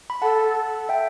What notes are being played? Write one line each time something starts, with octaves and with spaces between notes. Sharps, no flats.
B5
A4 F#5 A5
E5 G5